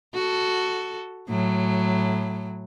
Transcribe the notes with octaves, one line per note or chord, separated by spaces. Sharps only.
F#4 A4
A2 F#3